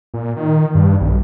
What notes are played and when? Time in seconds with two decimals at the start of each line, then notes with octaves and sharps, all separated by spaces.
0.14 A#2
0.37 D#3
0.75 G2
1.01 B1